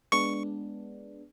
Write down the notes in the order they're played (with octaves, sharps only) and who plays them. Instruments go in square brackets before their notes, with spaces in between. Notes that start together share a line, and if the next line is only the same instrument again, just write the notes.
[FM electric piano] G#3 B3 D4 [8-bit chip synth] C#6